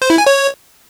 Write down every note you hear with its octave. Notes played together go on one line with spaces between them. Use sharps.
C5
E4
G#5
C#5